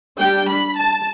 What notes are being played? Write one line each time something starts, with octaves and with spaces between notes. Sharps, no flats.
G3 D4 G5
B5
A5